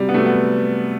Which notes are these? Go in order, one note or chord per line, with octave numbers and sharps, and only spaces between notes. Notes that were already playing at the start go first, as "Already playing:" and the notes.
Already playing: C3 F#3 G3
B3
C3 F#3 A3
B3